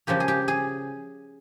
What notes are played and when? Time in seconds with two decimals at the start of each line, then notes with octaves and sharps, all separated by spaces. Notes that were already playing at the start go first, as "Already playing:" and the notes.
0.07 C#3 F3 A#3 G4
0.20 G#4
0.28 G4
0.48 G#4